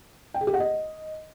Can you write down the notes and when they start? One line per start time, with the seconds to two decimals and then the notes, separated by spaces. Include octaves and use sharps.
0.34 G5
0.41 G#4
0.47 G4
0.54 F#5
0.60 D#5